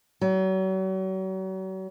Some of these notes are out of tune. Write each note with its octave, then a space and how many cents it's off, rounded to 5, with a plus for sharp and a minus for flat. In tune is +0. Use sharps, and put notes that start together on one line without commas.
F#3 +40